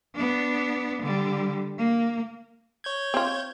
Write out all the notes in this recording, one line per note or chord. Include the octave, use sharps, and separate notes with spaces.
B3 D4
D3 G3
A#3
C#5 G6 G#6
C4 F4